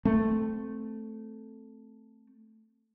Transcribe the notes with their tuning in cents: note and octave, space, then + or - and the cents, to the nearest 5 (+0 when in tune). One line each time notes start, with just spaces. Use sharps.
A3 +0 C4 +0